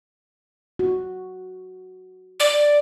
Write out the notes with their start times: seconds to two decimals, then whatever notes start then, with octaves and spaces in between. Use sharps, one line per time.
0.79 F#4
2.40 D5